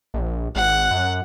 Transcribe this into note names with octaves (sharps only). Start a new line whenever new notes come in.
A#1
G#1 F#5
F#2